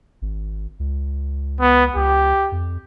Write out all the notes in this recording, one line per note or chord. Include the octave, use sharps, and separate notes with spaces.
G#1
C#2
B3
C#2 G4
F2